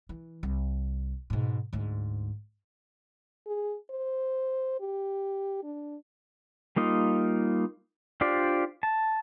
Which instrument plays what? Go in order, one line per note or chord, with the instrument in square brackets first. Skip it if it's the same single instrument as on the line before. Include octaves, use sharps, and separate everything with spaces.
[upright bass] E3
C2
G#2 B2
D2 G#2
[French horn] G#4
C5
G4
D4
[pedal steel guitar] G3 A#3 D#4 F4
D4 F4 G4 C5 D5
A5